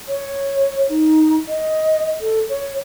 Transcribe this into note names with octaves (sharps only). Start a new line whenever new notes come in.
C#5
D#4
D#5
A4
C#5